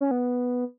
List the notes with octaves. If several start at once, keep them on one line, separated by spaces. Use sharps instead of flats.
C#4
B3